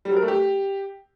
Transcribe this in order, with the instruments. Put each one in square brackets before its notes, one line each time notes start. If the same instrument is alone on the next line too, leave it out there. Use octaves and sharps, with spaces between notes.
[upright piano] G3
F#3
A#4
A3
G4